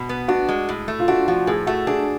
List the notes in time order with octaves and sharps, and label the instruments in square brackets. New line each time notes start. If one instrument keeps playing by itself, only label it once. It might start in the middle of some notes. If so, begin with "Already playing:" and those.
Already playing: [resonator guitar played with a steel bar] B2
B3
[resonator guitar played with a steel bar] D4 [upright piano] F#4
[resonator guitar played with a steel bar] G#3
A2
A3
[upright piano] F4
[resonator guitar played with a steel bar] D4 [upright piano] F#4
[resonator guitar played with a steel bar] F3 [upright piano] F#4
[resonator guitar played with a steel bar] A2 [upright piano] G#4
[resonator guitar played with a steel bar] A3 [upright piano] F#4
[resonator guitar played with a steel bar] D4 [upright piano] G#4